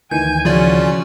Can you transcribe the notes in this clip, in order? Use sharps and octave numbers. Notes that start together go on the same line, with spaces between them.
D2 D#3 E3 G#5 G6
C#3 F3 C#4 F4 F#4 D5